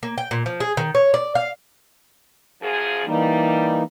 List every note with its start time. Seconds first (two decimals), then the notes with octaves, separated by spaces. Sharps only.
0.03 A#3
0.18 G5
0.31 A#2
0.46 F3
0.60 G#4
0.77 D#3
0.95 C#5
1.14 D5
1.35 F5
2.62 F#2 F3 G#4
3.06 E3 G3 A#3 D#4